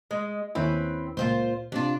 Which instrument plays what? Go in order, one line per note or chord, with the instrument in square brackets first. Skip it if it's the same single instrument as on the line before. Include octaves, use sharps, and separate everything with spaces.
[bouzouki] G#3 [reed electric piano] D#5
[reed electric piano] D#2 C#4 E4 [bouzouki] C4 B4
[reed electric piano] C#2 A#2 [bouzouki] F4 G#4 C5
[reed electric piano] C3 [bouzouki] D4 F4